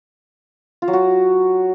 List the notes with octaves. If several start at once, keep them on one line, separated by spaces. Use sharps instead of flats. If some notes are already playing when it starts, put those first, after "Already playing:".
F4
F#3
F#4